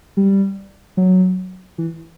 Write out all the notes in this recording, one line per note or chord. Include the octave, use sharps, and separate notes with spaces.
G3
F#3
E3